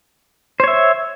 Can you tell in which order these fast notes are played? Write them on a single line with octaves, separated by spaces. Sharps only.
C5 C#5 E5